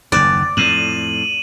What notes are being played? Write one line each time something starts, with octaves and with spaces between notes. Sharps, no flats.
F#1 D#2 D5
F2 A2 D#7 E7 F#7